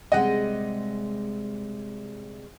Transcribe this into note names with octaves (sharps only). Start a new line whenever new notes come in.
C3 G3 G#3 D#5 F#5